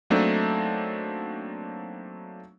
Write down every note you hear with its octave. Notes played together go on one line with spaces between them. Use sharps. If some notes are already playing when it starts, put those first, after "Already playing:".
F#3 A3 A#3 C4 D4 D#4